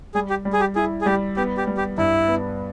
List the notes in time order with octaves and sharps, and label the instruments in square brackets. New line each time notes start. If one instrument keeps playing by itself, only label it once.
[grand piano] G3 [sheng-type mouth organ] G#4
[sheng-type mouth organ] G4
[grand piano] G3
[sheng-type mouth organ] G#4
G4
[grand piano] E4 [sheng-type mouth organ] G#4
[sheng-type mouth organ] G#4
[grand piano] G3 [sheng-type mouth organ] G4
[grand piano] B3 [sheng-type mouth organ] G4
[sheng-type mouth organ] G4
[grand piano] G3
[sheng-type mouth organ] G4
[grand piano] G2 [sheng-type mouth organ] E4
[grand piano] B3